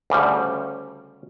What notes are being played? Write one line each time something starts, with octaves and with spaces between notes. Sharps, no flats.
D2 C#3 G3